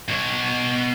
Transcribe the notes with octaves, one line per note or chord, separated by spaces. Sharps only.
B2 C#5